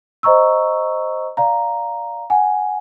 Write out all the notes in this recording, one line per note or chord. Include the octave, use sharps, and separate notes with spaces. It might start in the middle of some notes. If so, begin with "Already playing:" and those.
C5 D#5 A#5 C#6 E6
D5 F5 A#5
F#5 G#5